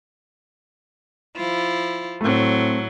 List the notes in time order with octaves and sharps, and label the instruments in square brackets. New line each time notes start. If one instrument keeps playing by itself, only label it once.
[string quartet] F3 E4 F4
[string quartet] A2 F#3 [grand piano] A3 C4